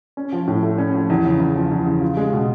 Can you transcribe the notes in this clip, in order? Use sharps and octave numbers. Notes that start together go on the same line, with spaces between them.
C#4
F3
A2
A3
C#4
F3
E2
C#3
E2
F3
E2
C#3
F4
G#3
B2